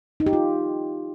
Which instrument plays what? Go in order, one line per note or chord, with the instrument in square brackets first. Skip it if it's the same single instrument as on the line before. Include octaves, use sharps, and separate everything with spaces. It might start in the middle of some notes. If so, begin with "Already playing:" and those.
[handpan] D#4
G4
F4